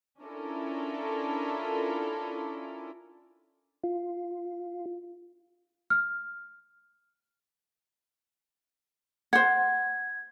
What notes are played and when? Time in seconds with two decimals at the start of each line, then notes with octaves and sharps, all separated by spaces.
0.23 C#4 D4 E4 F4 A4 A#4
3.84 F4
5.90 F6
9.33 C5 F#5 G#6